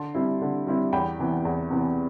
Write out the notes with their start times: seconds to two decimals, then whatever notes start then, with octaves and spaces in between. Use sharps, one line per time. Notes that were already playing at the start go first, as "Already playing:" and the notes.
Already playing: D3 A5 C6
0.15 G3 C4 E4
0.42 D3
0.67 G3 C4 E4
0.92 E2 G5 B5
1.19 C3 E3 B3
1.45 E2
1.70 C3 E3 B3